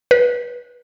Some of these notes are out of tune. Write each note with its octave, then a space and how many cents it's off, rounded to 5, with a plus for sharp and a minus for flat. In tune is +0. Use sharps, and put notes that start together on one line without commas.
B4 -20